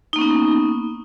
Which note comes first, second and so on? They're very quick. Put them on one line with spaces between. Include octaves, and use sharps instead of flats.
D#4 A#3 C#4 B3